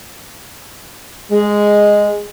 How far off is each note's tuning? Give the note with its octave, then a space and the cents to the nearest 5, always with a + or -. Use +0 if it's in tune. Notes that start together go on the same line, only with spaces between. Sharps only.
G#3 -5